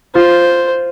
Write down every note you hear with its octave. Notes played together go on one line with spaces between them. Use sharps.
F4 C5